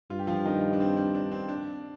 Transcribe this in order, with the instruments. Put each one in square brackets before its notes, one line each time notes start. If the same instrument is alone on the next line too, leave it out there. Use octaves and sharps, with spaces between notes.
[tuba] G2 [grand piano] F4
[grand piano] G4
F3 F4
D#3 D#4
D4
C4
D4
D4
C4
D4